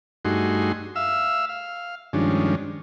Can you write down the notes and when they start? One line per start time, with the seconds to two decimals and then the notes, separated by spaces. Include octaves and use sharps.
0.25 G2 A3 D#4 F#4 G#4 C6
0.96 E5 F5 E6
1.49 F5
2.13 G2 D#3 F3 G#3 C#4 D4